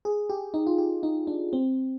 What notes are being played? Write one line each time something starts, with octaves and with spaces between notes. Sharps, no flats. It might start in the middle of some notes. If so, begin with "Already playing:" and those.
G#4
G4
D#4
F4
G4
D#4
D4
C4